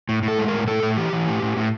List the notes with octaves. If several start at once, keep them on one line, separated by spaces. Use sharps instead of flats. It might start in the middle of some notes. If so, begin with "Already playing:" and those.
A2
A2
A4
G#3
A#4
A2
A2 A4
A2
E3 G4
E3
A2
A2
A2